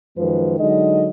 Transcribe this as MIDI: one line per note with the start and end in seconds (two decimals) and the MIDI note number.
0.17 0.59 42
0.17 0.59 51
0.17 0.59 53
0.17 0.59 56
0.17 0.59 71
0.59 1.09 50
0.59 1.09 54
0.59 1.09 56
0.59 1.09 63
0.59 1.09 75